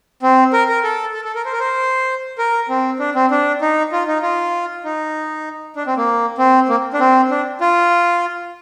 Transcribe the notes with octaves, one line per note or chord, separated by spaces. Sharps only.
C4
A#4
A#4
A4
A4
A4
A#4
C5
A#4
C5
A#4
C4
D4
C4
D4
D#4
F4
D#4
F4
D#4
D4
C4
A#3
C4
A#3
D4
C4
D4
F4